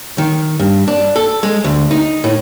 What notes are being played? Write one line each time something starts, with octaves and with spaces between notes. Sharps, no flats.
D#3
G2
D4
A4
G#3
D2
D#4
A2